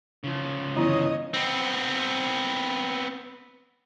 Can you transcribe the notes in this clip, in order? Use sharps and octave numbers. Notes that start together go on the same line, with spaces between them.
C#3 F3
G1 E3 C#5 D#5 A#5
B3 C4